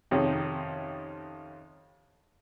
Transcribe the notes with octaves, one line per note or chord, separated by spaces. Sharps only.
F2 C3 D#3 C#4